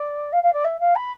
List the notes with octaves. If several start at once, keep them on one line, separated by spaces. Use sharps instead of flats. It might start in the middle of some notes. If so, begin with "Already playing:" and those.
Already playing: D5
F5
F5
D5
E5
F5
B5